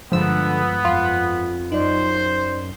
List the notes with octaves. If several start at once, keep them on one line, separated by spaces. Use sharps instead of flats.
G2 D3 F3 G#3 B3 E6
F2 F4
F#2 D#4 C5 D5